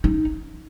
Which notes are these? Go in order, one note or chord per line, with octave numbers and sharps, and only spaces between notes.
D#4